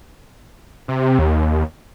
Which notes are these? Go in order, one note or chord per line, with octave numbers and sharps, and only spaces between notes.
C3
D#2